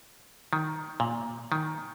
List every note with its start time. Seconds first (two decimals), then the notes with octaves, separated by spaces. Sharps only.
0.53 D#3
1.00 A#2
1.52 D#3